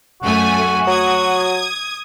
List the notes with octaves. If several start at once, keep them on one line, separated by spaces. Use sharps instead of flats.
F#2 A3 F#4 G#5
F#3 D#6 G#6